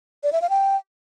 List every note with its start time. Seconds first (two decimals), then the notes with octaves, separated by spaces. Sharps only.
0.24 D5
0.33 E5
0.42 F5
0.50 G5